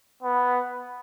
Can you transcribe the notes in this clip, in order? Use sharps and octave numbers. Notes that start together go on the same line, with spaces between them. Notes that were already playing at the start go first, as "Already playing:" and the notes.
B3